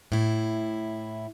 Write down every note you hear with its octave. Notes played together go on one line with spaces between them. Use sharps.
A2 E4